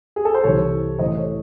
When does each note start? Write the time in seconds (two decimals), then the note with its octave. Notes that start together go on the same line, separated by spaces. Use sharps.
0.16 G#4
0.25 A4
0.34 C5
0.43 C2 C3 E3 A4 C#5
0.99 A1 A2 E3 C5 D#5
1.18 A4 C#5